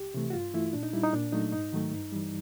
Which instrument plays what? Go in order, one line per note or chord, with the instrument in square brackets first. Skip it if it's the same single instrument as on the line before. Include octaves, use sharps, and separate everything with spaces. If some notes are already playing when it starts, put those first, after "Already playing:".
Already playing: [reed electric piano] C#2 G4
C3 E3 A3
F#4
G2 F4
E3 A3 E4
A#2 D4
D#4
G3 E4
D#4
A#2 D4
F#3 A3 D#4
G#2 D#4
D#3 F#3 A3
G2
E3 G3